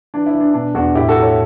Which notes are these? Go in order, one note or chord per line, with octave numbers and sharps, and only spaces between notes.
E3 D4
E4
E3
D4
B2 D4
E2 D4 F#4
A2 E4 G4
F#4 A4
A2
A4 C#5